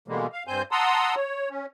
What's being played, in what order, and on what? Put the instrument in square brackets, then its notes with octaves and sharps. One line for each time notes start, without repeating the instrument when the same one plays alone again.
[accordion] B2 D3 E3 G3 G#3 A#3
F5
G2 C4 C5 G#5 G6
F#5 A5 A#5 C6 D#6 E6
C#5
C#4